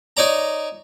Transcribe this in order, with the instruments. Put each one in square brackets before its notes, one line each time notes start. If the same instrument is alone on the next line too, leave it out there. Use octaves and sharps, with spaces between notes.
[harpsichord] D#4 C#5 D5 A#5